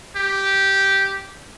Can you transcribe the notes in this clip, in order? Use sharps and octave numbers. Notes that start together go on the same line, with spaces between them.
G4